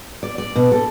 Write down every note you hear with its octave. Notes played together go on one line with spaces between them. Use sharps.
D5
D5
B2
A4